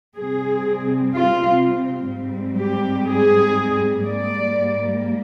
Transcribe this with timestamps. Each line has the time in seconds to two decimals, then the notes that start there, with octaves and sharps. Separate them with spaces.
0.17 C3 G3 C4 G#4
1.14 F4
2.11 G#2 G3 C4
2.60 G4
3.08 G#4
4.05 G#2 G3 A#3 D5